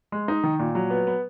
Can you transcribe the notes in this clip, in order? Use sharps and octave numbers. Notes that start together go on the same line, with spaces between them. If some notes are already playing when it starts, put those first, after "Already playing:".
G#3
D#4
D#3
A#2
F#3
B3
B3